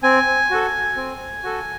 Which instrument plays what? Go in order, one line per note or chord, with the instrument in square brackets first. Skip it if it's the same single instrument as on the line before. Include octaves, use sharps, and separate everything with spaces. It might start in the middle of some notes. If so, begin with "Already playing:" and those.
[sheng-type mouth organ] C4 G#5
F#4 A4
C4
F#4 A4